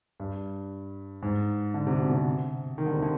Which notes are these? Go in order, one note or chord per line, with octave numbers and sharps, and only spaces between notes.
G2
G#2
D3
C3
B2
C3
D#3
D3
C3
D3